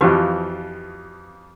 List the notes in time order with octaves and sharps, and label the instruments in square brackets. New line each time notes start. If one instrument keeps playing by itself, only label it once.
[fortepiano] F2 E3 F3 [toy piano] F#4 G4 B4